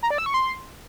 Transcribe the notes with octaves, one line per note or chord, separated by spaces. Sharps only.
A#5
D5
E6
C#6
C6